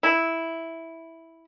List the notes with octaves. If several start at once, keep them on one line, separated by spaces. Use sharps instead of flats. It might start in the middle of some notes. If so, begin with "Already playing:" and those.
E4